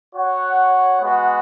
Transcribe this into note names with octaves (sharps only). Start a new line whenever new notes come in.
F#4 C#5 F#5
G#3 B3 F#4